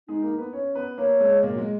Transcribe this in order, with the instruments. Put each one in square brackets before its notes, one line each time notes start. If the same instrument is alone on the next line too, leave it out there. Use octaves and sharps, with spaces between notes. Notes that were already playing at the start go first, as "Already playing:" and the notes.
[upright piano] G#3 G#4 [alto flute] D#4
[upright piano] A#3 A#4
B3 B4
C#4 C#5
B3 B4
[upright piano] A#3 A#4 [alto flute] C#5
[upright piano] G#3 G#4
A#2 A#3
F#3
G#3